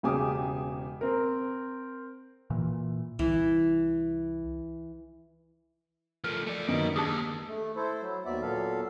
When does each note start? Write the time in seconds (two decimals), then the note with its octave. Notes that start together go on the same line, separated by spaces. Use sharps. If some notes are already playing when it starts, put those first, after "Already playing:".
0.03 E1 C#3 G4 G#5 D6 D#6
1.01 C4 A#4
2.50 A#2 E3
3.19 C2 E3
6.24 F3 A3 A#4
6.47 A3 D5
6.68 F#2 D#3 A#3 B4 D#5
6.96 D#2 G#3 D4 G4 G#4
7.49 A3
7.76 E4 A4 C5
8.01 F#3
8.25 D#2 F#3 B3 D5 E5
8.42 A#2 F#3 B3 A4 F5